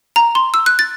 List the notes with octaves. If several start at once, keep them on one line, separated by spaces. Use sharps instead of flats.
A#5
C6
E6
F#6
A6